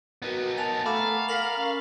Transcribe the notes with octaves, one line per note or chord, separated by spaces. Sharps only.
B3 D#4 F#4 A#4 B4
G#5 A5 A6 F7
A3 F5 F#5 A#5 B5 D6 E7
A#4 B6 C7 F#7
C#4 C#6